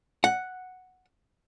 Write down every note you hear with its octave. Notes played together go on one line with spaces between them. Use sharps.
F#5